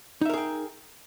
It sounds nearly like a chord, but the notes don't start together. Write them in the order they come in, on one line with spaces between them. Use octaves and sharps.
D#4 E5 A#4 G#4 G5